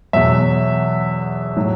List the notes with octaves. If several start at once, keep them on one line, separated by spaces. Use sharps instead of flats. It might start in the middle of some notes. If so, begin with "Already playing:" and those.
E2 B2 F#3 E5
A2 F#3